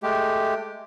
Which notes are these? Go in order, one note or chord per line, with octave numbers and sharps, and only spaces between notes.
G#3 A3 G4